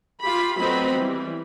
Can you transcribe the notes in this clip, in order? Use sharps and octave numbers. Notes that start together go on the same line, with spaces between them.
F4 G4 B5
F#3 A3 B3 C4 D#5 B5
E3 G3